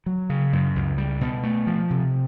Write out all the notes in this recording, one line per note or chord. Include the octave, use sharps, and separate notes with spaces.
F#3
C#3
F#2
C#2
G3
B2
A3
F3
C3